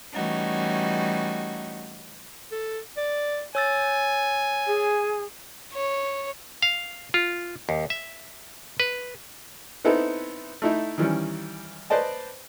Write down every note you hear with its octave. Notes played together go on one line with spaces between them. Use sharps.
E3 G3 A3 C#4 D#4 F#4
A4
D5
C#5 G#5 E6 A6
G#4
C#5
F5
F4
D#2
E5
B4
B3 C4 D#4 E4 A4 B4
A3 D#4 E4
D#3 E3 G3 C#4
B4 C5 D5 D#5 A5